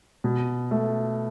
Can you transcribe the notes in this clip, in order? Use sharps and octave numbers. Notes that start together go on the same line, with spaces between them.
B2
A3